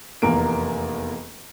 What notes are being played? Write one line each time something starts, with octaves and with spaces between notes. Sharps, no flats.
F1 E2 A#3 D7